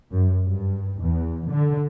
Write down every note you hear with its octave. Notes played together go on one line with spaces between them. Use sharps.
F#2
G2
E2
D3